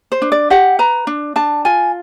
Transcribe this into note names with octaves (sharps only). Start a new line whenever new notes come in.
C5
D4
D5
G4 F#5
B4 A#5
D4
D4 A5
F4 G#5